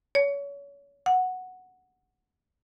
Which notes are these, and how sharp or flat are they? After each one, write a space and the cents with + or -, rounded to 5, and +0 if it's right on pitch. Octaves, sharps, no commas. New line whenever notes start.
C#5 +30
F#5 -5